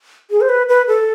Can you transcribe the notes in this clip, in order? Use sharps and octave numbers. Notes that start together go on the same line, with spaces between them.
G#4
C5
B4
B4
A4